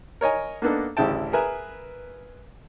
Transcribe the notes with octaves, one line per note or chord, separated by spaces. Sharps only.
A#4 C#5 D#5 G#5
A#3 B3 D4 D#4 A4
A1 D2 C#3 E4 G5 A5
G#4 A#4 B4 E5 G#5